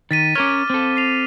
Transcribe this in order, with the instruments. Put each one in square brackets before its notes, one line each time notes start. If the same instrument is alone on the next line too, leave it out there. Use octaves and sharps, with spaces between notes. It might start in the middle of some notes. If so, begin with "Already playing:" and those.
[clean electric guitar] D#3 [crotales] A6 B6 D#7
[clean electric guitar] C#4 A#4 C#5 [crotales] D6 F6
[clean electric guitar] C4 A4
[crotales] C7 F7